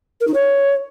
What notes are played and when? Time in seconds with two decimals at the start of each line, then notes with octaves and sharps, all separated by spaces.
0.20 A#4
0.27 D#4
0.34 C#5